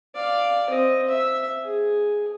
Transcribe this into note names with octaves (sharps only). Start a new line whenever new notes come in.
D5 F5
C4 D#5
E5
G#4